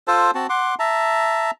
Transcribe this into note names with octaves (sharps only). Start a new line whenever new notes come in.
F4 A4 C5 A5
C4 F#4 A5
F#5 C6 D6
E5 A5 A#5